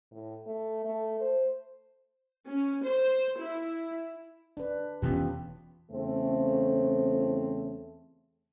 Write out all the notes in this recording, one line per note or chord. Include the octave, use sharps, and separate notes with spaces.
A2
A3
A3
C5
C#4
C5
E4
D4 B4
E1 E3 B3 C#4 F4 G4
E2 C#3 A3 C4